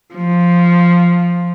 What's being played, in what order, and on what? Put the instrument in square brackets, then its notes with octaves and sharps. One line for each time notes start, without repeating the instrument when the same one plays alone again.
[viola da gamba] F3